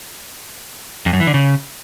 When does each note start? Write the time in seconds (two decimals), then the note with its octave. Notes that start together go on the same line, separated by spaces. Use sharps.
1.06 F2
1.13 F#2
1.20 E3
1.27 D3
1.34 C#3